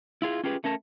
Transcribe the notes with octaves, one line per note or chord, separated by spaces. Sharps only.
E4 F4 G#4
C#4 F4 G4 G#4 B4
A3 C#4 A#4 A5